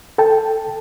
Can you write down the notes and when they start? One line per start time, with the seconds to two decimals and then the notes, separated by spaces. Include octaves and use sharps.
0.18 A4 G5 A5